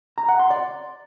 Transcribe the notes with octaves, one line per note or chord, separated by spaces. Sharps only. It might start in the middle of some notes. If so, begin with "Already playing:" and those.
A#5
F#5
C6
D5